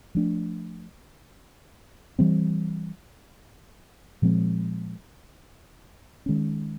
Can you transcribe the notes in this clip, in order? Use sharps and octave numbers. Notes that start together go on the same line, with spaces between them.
F3 A3 D4
E3 G3 C4
A#2 F3 G#3 C4
D#3 G#3 C#4